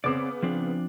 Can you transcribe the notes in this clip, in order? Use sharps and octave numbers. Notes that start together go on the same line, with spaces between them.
C#3 B3 C4 C#5 D5 D6
F3 C4 D4